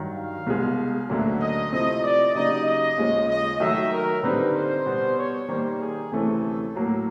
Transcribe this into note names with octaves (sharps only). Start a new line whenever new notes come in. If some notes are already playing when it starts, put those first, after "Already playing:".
Already playing: G2 D#3 F#3
F5
C2 B2 G#3
D2 D3 F#3 A#3 C#4 E5
D#5
C3 F3 A3 C4 E4 D#5
D5
C#3 F#3 A#3 D#4 G4 D#5
D#5
D#2 C#3 F3 G#3 C#4
D#5
D#3 F#3 A3 E5
A#4
D3 G3 C4 D#4 B4
C5
B2 G3 B3
C#5
D#3 G3 A#3 C5
G#4
D2 C3 E3 A3 C#4 A4
A2 F#3 A#3